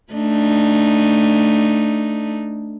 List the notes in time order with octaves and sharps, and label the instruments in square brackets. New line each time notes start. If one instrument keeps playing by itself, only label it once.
[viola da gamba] A3 D4 D#4